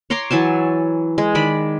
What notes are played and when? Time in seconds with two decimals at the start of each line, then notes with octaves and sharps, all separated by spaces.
0.10 C#5 A#5 C6 D6
0.31 E3 F#3 G#5 A5
1.18 G#3
1.35 D#3 D5 B5